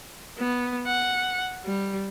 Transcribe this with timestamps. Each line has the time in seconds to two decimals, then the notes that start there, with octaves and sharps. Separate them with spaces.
0.38 B3
0.86 F#5
1.64 G3